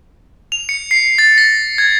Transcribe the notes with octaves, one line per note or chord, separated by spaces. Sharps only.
F7
C#7
C7
A6
A#6
G#6